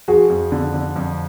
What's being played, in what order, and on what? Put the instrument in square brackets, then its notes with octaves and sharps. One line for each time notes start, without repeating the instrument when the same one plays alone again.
[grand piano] F3 [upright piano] F#4 G#4
[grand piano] F2
D3
D3
F2